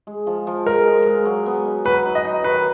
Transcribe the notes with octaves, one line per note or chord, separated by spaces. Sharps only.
G#3
F3
F3
G#3 A#4
G#3
G#3
F#3
B3
D#4
F#3 B4
D#4
D#5
D#4
D#3 B4